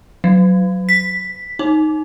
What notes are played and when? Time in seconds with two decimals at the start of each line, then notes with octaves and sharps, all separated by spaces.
0.24 F#3
0.89 B6
1.59 D#4